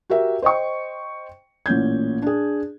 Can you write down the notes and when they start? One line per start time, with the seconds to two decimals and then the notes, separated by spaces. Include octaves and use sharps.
0.10 F#4 G4 A#4 E5
0.42 C5 D#5 G5 C#6
1.66 A1 A#2 C#4 G6 G#6
2.22 D4 G#4